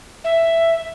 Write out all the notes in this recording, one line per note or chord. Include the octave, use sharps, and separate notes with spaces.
E5